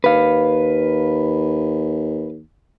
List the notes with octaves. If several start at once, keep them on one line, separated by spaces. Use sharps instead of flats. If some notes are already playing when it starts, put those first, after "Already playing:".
D#2 B4 F5